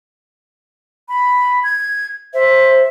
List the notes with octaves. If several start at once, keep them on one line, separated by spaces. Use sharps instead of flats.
B5
G#6
C5 E5